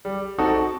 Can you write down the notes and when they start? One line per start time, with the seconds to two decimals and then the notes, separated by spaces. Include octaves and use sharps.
0.05 G3
0.38 C4 D#4 F#4 A4